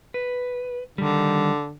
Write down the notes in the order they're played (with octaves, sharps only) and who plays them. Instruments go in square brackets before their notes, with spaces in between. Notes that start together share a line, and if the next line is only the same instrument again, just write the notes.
[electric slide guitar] B4
[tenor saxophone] D3 [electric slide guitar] D#3 G3